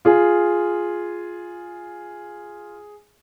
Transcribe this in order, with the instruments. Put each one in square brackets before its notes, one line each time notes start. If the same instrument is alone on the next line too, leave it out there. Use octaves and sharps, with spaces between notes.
[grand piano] F4 G#4